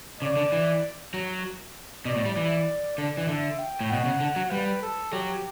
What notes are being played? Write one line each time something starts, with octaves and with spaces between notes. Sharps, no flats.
C#3 D5
D3
E3
F#3
B2 D5
A2
G3
E3 D5
D3 D5
E3
D3 E5
G5
A2
B2 F#5
C#3
D3
F#3
G3 B4
A4
F#3 G4